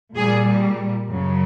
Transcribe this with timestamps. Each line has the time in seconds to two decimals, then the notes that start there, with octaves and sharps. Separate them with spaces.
0.16 A#2 G3 G#4
1.09 F#2 C#3 F#3